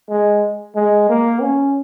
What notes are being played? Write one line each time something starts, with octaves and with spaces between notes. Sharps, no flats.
G#3
G#3
A#3
C#4